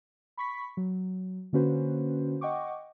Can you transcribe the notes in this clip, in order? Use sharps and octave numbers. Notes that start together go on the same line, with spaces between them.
B5 C#6 B6
F#3
D3 A#3 C#4 F#4 B4 C5
D#5 F#5 G5 C#6 D6